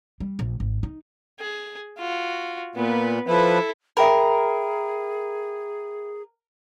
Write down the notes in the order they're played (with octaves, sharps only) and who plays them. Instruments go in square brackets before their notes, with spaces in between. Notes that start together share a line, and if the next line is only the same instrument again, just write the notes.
[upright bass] G3
A#1
G#1
D#4
[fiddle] G#4
F4 F#4
[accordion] A#2 [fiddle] B3 B4
[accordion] F3 B4 [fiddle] E4 A4
[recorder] G#4 [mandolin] A#4 [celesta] E5 G5 B5